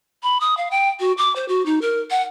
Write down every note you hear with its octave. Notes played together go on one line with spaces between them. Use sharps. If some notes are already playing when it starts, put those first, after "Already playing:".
B5
D#6
F5
G5
F#4
D6
C5
F#4
D#4
A#4
F#5